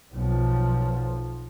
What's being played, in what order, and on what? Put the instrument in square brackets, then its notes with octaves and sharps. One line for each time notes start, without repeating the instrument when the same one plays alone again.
[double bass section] B1 F3